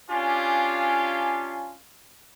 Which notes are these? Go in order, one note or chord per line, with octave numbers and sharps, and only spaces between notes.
C#4 D4 F4 G4 F5 G#5